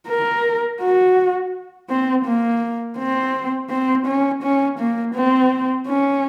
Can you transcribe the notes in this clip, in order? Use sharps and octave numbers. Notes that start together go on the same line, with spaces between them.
A#4
F#4
C4
A#3
C4
C4
C#4
C#4
A#3
C4
C#4